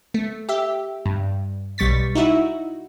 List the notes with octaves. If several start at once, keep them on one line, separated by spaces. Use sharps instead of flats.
A3
G4 E5
G2
B1 G3 C#6 A6 B6
D#4 E4 F#4 E5